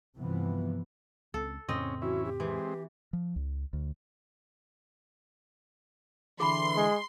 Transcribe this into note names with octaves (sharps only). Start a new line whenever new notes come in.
G2 C3 E3 F3 B3
C#2 C4 A4
F2 A2 C#3 C4 C#4 D#5
E3 C#4 E4 F#4
G4
E3 G#3 C4
F3
C#2
D2
D3 E3 G#4 B5 C6
G#3